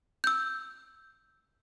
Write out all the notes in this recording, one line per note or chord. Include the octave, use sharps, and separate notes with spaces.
E6 G6